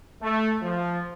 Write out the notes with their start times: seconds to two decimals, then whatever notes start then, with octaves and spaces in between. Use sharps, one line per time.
0.22 A3
0.61 F3